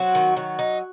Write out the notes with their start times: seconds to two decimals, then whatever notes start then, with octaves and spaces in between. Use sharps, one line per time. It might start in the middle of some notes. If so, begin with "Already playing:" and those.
Already playing: F#3 C4 F#4
0.15 D#3
0.37 F#3
0.59 D#4